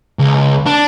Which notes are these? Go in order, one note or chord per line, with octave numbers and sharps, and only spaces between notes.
C#2
D4